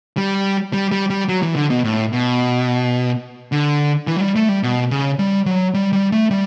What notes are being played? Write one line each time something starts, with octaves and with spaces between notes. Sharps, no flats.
G3
G3
G3
G3
F#3
E3
D3
B2
A2
B2
D3
E3
F#3
G3
A3
G3
B2
C#3
G3
F#3
G3
G3
A3
G3